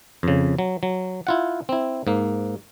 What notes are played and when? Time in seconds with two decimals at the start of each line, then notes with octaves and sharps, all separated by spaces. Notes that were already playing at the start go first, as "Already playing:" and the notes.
0.23 F2 C#3
0.59 F#3
0.83 F#3
1.27 E4 F4 F#5
1.69 C4 E4
2.07 G#2 A#3